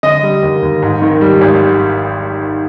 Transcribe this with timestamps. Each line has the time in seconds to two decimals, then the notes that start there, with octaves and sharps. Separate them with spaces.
0.03 D3 D#5
0.23 G3
0.43 D#2
0.63 D#2
0.82 G#2
1.02 D#3
1.21 G3
1.41 G#1